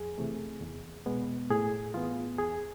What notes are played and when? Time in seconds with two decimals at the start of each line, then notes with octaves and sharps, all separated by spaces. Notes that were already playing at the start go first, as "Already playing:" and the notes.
Already playing: F2 G#4
0.18 C3 E3 A3
0.61 E2
1.06 B2 G#3 B3
1.50 A2 G#4
1.94 E3 B3 F4
2.38 E2 G#4